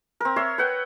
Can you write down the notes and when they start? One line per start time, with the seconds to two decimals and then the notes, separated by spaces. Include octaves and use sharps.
0.20 C4 A#4
0.36 C#5 E5 C6
0.58 B4 F#5 G5